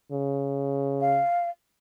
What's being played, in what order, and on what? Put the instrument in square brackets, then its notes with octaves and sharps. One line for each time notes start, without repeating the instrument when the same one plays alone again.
[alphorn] C#3
[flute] F5